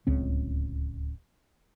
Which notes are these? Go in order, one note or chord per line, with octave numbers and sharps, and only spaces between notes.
D1 C#2 C#3 C4